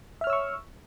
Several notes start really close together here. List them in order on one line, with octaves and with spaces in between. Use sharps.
E5 F6 C#5 E6 C#6